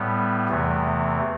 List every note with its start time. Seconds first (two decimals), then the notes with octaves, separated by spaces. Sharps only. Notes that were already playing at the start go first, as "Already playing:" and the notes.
Already playing: A2 G3 B3
0.49 E2 C3 E3 A3